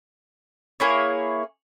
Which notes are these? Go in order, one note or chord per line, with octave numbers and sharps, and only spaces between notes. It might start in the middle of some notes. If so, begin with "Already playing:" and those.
A#3 E4 G#4 C#5